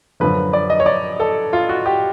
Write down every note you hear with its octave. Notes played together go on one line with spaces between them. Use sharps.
F#2 D3 F3 B4
D5
D#5
C#5
D5
A4
F4
F#4
G4